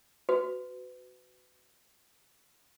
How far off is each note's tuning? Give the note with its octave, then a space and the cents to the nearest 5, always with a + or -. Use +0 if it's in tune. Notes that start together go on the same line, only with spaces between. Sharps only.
F#4 +0 B4 +30